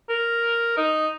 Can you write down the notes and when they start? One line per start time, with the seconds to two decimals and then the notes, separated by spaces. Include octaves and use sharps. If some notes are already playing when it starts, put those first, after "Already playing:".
0.09 A#4
0.77 D#4